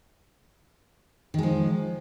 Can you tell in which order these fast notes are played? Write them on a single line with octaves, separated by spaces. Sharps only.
D#3 G#3 F3